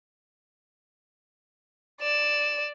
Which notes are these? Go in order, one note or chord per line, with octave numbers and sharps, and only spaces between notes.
D5 E7